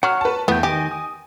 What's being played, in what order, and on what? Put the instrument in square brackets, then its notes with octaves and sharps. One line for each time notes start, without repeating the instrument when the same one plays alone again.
[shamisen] F#3 [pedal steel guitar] F#5 C#6 F6
[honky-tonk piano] B4 A5
[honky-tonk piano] E2 [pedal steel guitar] A3 G5 [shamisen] B3
[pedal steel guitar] D#3 D#5 G5 [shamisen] G4 [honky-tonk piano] G#5
[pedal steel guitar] D#6